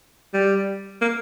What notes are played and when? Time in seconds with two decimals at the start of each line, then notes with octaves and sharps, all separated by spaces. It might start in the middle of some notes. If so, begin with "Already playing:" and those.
0.33 G3
1.01 A#3